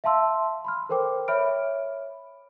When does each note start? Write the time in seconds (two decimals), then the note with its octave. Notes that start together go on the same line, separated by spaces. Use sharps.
0.04 E5 F5 A5 C6 E6
0.65 B5 C6 F6
0.89 A4 A#4 C5 G5 D6
1.28 C#5 E5 B5 F6 D7